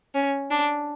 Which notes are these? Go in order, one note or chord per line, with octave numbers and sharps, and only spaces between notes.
C#4
D4